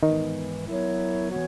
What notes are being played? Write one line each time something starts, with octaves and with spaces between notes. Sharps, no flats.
G#2 D#3 E3 G#3 B3 D#4
F#3 B3 E4 A#4 C#5
E3 B3 F#4 C#5